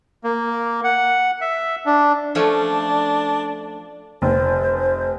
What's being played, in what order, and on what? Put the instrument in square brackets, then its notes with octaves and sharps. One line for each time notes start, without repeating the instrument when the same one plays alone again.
[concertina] A#3
F#5
E5
D4
[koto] F3 A3 C#4 [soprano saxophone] D4
[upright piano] F1 [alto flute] C5